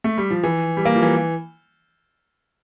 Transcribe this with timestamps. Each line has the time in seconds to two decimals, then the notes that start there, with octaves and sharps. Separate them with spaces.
0.04 A3
0.18 G3
0.30 F3
0.43 E3
0.77 G3
0.85 A#3
0.95 F3
1.02 E3